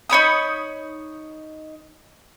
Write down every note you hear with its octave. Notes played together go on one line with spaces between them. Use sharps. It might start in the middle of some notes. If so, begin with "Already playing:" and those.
D#4 C#5 B5 D#6